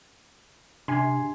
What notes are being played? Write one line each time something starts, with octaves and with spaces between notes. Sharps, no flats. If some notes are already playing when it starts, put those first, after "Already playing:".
C3 D4 G#5 C6